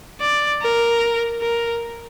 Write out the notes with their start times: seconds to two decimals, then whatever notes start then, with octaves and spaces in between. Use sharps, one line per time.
0.21 D5
0.62 A#4
1.42 A#4